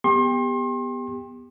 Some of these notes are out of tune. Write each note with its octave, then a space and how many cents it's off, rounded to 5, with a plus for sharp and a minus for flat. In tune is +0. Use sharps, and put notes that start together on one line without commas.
B3 +0 G4 +25 C6 +35